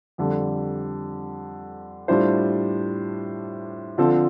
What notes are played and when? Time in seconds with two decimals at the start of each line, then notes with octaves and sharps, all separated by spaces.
0.18 F2 D3 G3
2.08 A2 G3 D4 F4 C5
3.98 D3 F3 C4 F4 A4